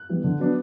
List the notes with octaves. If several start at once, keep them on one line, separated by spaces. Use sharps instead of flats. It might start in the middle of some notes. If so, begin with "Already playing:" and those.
Already playing: F#6
E3 G3 B3
D3
F#3 B3 D4